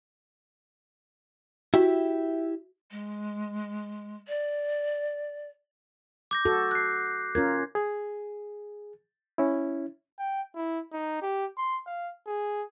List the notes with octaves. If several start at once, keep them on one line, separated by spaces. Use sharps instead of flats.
E4 F#4 G4 E5
G#3
D5
D6 G6 A#6
F#4 A4
F#6 C7
C#4 F4 A#4 G#6
G#4
C#4 E4
G5
E4
D#4
G4
C6
F5
G#4